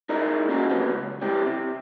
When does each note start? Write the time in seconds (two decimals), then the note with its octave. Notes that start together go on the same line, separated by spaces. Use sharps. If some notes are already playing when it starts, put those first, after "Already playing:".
0.09 D#4 E4 G#4 A#4 D5 D#5
0.49 A#3 C#4 D#4 F4 F#4 G#4
0.70 D#2 C3 F3 F#3 B3 C4
0.92 C#2
1.21 E3 G3 C4 G4
1.46 C3